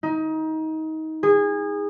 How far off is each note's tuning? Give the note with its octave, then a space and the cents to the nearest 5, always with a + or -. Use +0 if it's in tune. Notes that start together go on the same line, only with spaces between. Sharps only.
D#4 +25
G#4 -25